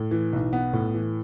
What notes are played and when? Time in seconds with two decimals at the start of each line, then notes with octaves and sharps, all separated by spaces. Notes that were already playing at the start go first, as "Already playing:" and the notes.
Already playing: A2
0.11 E3
0.33 B1
0.53 B3
0.73 A2
0.94 E3